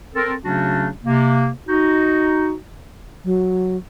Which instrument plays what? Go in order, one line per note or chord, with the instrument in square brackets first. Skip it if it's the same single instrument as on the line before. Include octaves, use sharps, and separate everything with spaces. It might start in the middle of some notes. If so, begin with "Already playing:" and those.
[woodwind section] C4 A4 A#4
C#3 F#3 A3 C#4 D4 F#4
C3 A#3
D#4 F#4
[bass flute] F#3